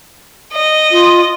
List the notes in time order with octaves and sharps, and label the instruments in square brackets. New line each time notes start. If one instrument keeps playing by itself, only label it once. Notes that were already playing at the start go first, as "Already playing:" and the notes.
[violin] D#5
[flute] F4